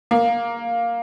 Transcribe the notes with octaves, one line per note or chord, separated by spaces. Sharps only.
A#3